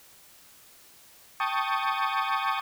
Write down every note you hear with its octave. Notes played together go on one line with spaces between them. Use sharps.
G5 A5 C#6 D#6